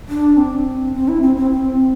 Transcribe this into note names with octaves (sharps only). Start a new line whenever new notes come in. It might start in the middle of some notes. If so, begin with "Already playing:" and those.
D4
C4
C4
E4
C4
C4
C4